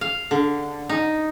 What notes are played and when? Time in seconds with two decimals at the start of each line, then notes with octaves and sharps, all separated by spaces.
0.01 F5
0.31 D3
0.89 D#4